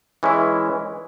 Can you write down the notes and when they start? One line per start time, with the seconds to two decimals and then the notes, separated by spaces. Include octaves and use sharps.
0.23 E3 G#3 C#4 E4 G#4